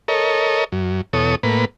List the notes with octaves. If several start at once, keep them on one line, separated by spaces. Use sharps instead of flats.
A4 A#4 C#5 D#5
F#2
E2 B2 A4 C#5 D#6
A2 A#3 B4